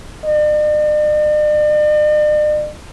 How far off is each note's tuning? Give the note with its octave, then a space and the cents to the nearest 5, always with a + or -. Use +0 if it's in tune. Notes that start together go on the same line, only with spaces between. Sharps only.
D5 +45